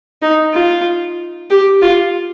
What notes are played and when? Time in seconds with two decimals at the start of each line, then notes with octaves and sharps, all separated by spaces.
0.22 D#4
0.54 F4
1.51 G4
1.82 F4